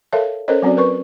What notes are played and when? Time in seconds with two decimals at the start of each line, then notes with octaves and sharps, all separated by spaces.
0.13 A4 A#4 C#5 E5 F5 A5
0.48 C#4 A4 A#4 C5 C#5 D#5
0.62 F#3 C4 C#4 F#4 D5
0.77 A#4 B4 C#6